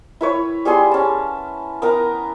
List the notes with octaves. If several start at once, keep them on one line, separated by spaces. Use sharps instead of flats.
E4 B4 C#5
G3 B3 G#4 C6
C#4 A5
B3 A#4 A#5